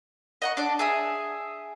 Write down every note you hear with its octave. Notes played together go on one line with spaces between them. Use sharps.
D#5 F#5 C#6
D4 D5 A5
G#4 E5 D#6